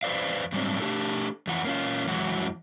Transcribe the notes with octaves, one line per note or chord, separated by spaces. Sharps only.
E2 B4 C5 D5 F5
G#2 F#3 G3 A3 C4 D4
A3 D4 G4 A4
F2 E3 F4 F#5
A#3 C#4 F4
F2 E3 F#3 G#3 F#4